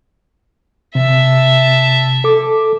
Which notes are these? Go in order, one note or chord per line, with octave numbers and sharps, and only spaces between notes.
C3 E5 A5
A4 D6